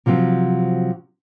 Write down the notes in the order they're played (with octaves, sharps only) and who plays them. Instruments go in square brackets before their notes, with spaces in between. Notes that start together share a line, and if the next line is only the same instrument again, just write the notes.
[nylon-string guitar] C3 F3 F#3 C4